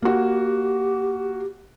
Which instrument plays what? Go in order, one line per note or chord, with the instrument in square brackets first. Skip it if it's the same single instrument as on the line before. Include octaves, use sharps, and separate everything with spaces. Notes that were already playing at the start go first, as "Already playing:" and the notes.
[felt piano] A#3 F#4 [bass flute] G4